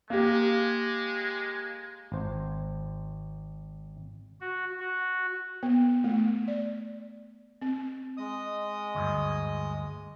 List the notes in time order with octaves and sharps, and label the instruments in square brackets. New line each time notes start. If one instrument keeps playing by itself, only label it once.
[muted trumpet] G#3 [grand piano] A#3 G4
[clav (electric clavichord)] G#1 C5
[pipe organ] F#4
F#4
[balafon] B3
A3
D5
C4
[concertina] G#3 D#5 D#6
[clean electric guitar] D2 G2